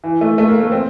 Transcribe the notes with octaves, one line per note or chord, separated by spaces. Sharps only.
E3
A3
A3
A#3
A3
C4